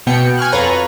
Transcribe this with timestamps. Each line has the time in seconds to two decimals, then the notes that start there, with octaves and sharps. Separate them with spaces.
0.07 B2 B3 G5 C#7
0.37 G#5 C#6 F6 F#6
0.52 F2 F4 A4 B4 C#5 A#5